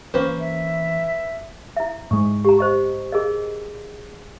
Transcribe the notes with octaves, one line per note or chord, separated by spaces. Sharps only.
E3 A#3 C#4 B4 C5
E5
E4 E5
G#2 G#3 C#6
G4 A#5
C5 D#5 C#6
G#4 A#4 D#5